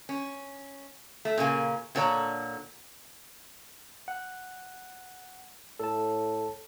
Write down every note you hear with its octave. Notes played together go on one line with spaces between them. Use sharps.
C#4
A3
A#2 C#3 A#3 G#5
A#2 D3 A4 C#5 D5 A#5
F#5
A2 A4 A5